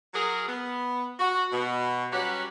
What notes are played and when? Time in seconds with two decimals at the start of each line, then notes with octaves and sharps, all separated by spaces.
0.14 F#3 G#4 A#4
0.47 B3
1.19 F#4
1.52 B2
2.12 F#3 G3 C#4 F#4 G4 B4